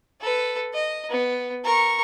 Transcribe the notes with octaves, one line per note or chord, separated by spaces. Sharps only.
A4 B4
D#5
B3
A#4 C#6